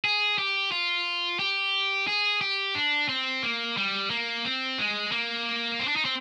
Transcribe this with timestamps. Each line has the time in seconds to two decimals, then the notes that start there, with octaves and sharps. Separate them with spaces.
0.05 G#4
0.38 G4
0.72 F4
1.39 G4
2.07 G#4
2.41 G4
2.75 D4
3.09 C4
3.43 A#3
3.77 G3
4.10 A#3
4.45 C4
4.78 G#3
5.12 A#3
5.79 C4
5.88 D4
5.96 D#4
6.05 C4